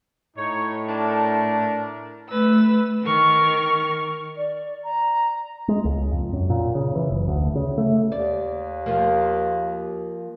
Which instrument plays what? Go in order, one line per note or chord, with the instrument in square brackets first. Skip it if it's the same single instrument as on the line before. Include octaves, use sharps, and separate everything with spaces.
[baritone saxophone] A2 [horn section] D#4 C#5
[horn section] A3 D4 A#4
[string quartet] A3 B4 E6
D#3 A#4 C#6 F6
[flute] D5
A#5
[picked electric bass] G#3
C#2
F2
F#2
A#2
C#3
E3
F#1
D2
C#3
A3
[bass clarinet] D#2 [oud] D5
[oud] F3 A#3